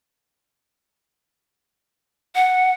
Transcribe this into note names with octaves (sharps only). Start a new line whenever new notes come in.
F#5